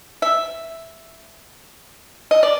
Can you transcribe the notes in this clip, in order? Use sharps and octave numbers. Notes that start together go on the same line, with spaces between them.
E5
D#5
D5